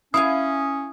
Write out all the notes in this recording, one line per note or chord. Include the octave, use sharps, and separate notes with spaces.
C#4 E4 F5 G#5 D#6